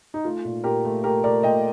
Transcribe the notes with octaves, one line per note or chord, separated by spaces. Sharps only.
D#4
A3 F4
A#2
A#2 G4 A#4
A3
A3 G4 A#4
A3 A#4 D5
A#2 D#5 G5